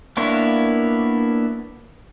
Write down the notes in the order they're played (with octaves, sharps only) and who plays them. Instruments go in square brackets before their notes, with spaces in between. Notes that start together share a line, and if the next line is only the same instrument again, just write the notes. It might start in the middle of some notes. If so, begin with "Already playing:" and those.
[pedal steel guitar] A#3 B3 D4 E4 C#5